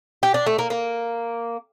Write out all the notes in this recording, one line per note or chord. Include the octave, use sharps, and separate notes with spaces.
G4
D4
A3
A#3
A#3